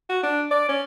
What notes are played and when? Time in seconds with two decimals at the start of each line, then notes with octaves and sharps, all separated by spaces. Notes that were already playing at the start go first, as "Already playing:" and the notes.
0.09 F#4
0.23 D4
0.51 D5
0.69 C#4